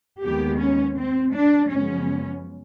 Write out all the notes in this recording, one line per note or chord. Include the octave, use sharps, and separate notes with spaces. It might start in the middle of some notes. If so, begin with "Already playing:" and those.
D#2 D#3 G#3 B3 G4
C#4
C4
D4
F#2 C#3 F3 G#3 B3 C#4